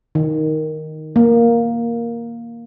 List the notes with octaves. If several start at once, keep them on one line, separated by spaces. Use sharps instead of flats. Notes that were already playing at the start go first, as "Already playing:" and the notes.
D#3
A#3